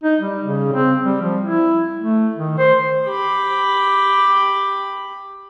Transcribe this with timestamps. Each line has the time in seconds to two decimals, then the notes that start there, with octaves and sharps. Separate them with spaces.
0.04 D#4
0.20 G3
0.43 C#3
0.73 C4
1.03 G3
1.22 F3
1.41 E4
2.00 A3
2.36 D#3
2.58 C5
3.07 G4 B5